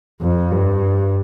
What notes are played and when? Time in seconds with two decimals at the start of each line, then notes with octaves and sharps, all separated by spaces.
0.21 F2
0.51 G2